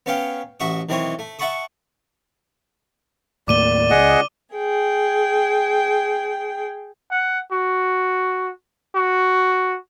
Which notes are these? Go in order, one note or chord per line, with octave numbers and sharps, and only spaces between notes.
B3 C#4 C#5 F5 G5
A1 F#4 E5 C#6 D#6
B1 D#3 E3 C4 C#5 D#6
A3
E5 F#5 A5 B5 C#6 D#6
D#2 A2 A#3 D5 D6 D#7 G7
C#2 G#4 D#5 F#5
G#4 G5
F#5
F#4
F#4